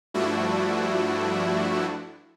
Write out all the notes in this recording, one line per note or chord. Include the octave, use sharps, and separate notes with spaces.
G2 F3 A3 D4 E4 F#4